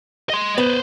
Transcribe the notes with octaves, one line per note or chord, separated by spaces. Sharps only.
D#5 C6
B3 B4 C5